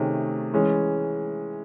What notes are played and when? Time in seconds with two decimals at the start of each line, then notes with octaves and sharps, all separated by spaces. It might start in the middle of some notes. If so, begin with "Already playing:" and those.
Already playing: C3 D#3 A3 C#4 G#4
0.53 E3 G#3 C#4